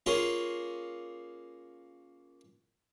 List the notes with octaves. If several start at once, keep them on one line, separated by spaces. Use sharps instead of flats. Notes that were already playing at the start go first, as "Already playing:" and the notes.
A#3 C#4 F4 G#4